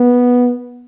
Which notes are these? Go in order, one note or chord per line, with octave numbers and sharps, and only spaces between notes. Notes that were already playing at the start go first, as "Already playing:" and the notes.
Already playing: B3